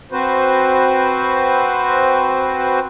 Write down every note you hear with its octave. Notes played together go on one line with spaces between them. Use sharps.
C4 F#4 B4 C5